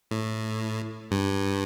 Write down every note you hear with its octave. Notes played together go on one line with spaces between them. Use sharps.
A2
G2